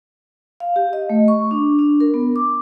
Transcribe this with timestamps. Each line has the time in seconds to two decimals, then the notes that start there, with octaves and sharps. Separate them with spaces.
0.60 F5
0.76 G4
0.93 D#5
1.10 A3
1.28 C#6
1.51 D4
1.79 D4
2.00 A#4
2.14 B3
2.36 D6